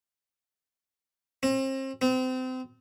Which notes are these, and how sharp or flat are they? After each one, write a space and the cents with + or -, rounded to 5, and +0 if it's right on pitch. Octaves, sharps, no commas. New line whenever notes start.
C4 +35
C4 -30